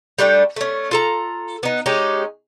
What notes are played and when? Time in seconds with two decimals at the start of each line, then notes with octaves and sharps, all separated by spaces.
0.18 G3 A3 D4 G5
0.56 A3 C#4
0.91 F4 A4 A#5
1.63 B3 D#4
1.86 G#3 C#4 D#4 G4